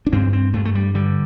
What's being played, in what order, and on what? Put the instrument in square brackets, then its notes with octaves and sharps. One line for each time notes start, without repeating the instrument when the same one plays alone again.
[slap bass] D4
G2 C4
C4
G2 A3
A3
G3
D3 G3